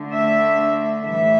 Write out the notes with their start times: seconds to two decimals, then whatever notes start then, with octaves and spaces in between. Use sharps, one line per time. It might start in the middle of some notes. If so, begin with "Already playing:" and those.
Already playing: D3 A3
0.13 E5
1.06 A2 E3 G3 E5